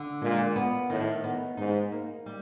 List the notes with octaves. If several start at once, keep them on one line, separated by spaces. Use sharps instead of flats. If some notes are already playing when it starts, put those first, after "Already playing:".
Already playing: D3
A#2 G#3
B3
A2 D#3
B3
G#2 D#4
A#3
G3